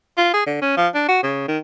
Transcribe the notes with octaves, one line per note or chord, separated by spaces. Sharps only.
F4
G#4
D3
C#4
F3
D4
F#4
C#3
D#3